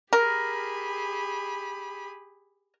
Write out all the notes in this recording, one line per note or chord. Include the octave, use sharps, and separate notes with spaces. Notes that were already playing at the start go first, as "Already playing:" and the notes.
G4 G#4 A#4 B5